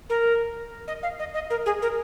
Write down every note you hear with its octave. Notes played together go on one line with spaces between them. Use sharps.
A#4
D#5
F5
D#5
D#5
A#4
G#4
A#4